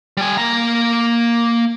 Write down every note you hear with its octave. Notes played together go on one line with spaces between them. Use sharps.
G3 G#5
A#3 A#5